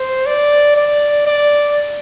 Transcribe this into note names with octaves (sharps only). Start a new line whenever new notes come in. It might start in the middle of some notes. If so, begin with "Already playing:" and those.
Already playing: C5
D5
D5
D5